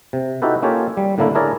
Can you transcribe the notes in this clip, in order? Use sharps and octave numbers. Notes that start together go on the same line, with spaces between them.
C3
D#4 E4 F#4 G4 A4 B4
A#3 C#4 F4 G4 A4 C#5
G3
A2 D3 A3 A#3 D4 E4
D4 E4 G#4 A#4 C#5 D5